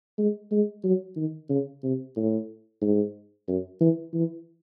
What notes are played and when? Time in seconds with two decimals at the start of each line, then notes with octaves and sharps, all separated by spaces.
0.18 G#3
0.51 G#3
0.84 F#3
1.16 D#3
1.49 C#3
1.83 C3
2.16 A2
2.81 G#2
3.48 F#2
3.80 E3
4.14 E3